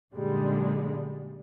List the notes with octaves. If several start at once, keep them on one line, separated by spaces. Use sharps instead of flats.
F#2 A#2 D3 G3 G#3